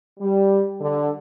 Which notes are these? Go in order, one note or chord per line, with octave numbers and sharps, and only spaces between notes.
G3
D3